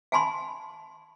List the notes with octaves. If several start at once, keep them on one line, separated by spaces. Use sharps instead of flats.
F5 G#5 A5 B5 C6